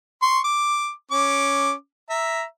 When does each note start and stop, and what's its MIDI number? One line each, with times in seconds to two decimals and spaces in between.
0.22 0.39 84
0.22 0.39 85
0.44 0.90 86
1.11 1.72 61
1.11 1.72 86
2.10 2.43 76
2.10 2.43 82